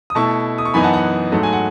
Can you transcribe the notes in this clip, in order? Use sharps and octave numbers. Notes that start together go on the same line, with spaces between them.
D#6
B2 A3 E4 A5 C#6
D#6
C#6
F#2 E3 B3 D#4 G#5 B5
F#5 A5
F#5
G#2 F#3 A3
G#5
F#5